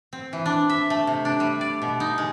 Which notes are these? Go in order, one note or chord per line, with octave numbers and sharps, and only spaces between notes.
C4
E3
D4
E5
A3
C3
D4
G3
D5
B2
D#4
G#3